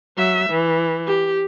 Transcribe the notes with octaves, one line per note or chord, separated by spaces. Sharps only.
F#3 E5
E3
G4